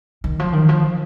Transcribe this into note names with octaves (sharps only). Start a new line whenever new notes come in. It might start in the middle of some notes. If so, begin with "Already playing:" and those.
D#3
F3
D#3
F3